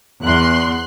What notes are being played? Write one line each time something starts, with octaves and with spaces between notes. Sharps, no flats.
E2 C6 F#6